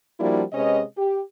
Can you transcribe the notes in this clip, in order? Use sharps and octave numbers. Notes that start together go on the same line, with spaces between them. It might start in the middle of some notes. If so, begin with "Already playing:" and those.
F3 G3 A#3 D4 E4 F#4
C3 G#3 C#4 B4 D#5
G4